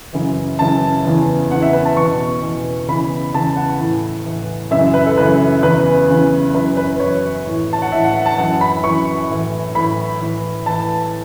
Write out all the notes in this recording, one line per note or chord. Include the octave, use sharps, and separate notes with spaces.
F#2 C#3 E3
F#2 C#3 E3 A5
E2 C#3 E3
E2 C#3 E3 F#5
E5
B4
A5
E2 B2 C#6
E2 B2
E2 C#3 E3 B5
E2 C#3 E3 A5
F#5
A2 E3
A2 E3
F#2 C#3 E3 E5
B4
A4
F#2 C#3 E3 B4
E2 C#3 E3 B4
E2 C#3 E3
F#2 E3 B4
B4
F#2 E3 C#5
A2 E3
A5
F#5
A2 E3 E5
F#5
F#5
A5
F#2 E3 F#5
B5
F#2 E3 C#6
A2 E3
A2 E3 B5
A2 E3
A2 E3 A5